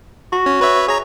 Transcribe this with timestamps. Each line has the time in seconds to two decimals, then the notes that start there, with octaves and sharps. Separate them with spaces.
0.32 F#4
0.46 C#4
0.61 B4 C#5 E5
0.88 G#4 C#5 A#5